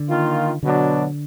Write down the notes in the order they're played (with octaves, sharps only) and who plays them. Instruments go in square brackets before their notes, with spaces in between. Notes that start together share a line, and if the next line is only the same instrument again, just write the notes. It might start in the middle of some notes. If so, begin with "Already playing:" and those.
Already playing: [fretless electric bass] D3
[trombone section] D#3 A#3 F4
[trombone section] B2 F#3 D4 [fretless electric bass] D3